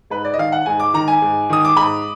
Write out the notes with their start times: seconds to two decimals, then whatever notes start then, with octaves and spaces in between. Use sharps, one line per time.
0.10 G#2 B4
0.25 D5
0.34 D#5
0.38 D#3 F5
0.52 F#5
0.66 G#2 G#5
0.80 D6
0.94 D#3 A#5
1.08 G#5
1.22 G#2
1.50 D#3 D#6
1.65 D6
1.76 G#2 B5